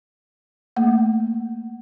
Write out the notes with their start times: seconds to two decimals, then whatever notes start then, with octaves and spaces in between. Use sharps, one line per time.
0.76 A3 A#3